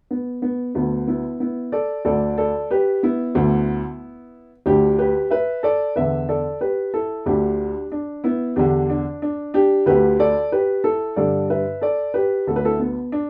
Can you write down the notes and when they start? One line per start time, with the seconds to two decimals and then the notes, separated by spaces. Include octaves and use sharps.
0.11 B3
0.42 B3
0.75 D2 D3 B3
1.07 B3 E4
1.40 B3 E4
1.72 A4 D5
2.05 D2 D3 A4 D5
2.38 A4 D5
2.71 G4 B4
3.03 B3 E4
3.35 D2 D3
4.66 D2 D3 D4 G4
4.99 G4 B4
5.30 B4 E5
5.63 A4 D5
5.96 E2 D3 B4 E5
6.29 A4 D5
6.61 G4 B4
6.94 E4 A4
7.26 D2 D3 D4 G4
7.92 D4
8.24 B3 E4
8.56 E2 D3 D4 G4
8.90 D4
9.22 D4
9.54 D4 G4
9.86 D2 D3 G4 B4
10.19 A4 D5
10.52 G4 B4
10.84 E4 A4
11.16 G2 D3 A4 D5
11.50 B4 E5
11.81 A4 D5
12.14 G4 B4
12.47 D2 D3 A4
12.56 B4
12.65 E4 A4
12.80 B3
13.12 D4